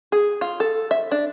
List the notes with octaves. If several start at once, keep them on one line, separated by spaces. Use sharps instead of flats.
G#4
F4
A4
E5
D4